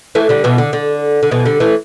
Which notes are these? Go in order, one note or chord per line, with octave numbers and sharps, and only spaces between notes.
E3 A3
D3 G3
B2 E3
D3
D3
D3
B2 E3
D3 G3
E3 A3